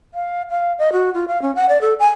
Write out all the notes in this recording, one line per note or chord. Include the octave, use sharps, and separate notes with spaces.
F5
F5
D#5
F#4
F4
F5
C#4
F#5
D5
A4
G#5